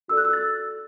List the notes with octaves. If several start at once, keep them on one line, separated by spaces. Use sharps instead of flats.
F#4 A4 D5 E6
F#6
E6
A6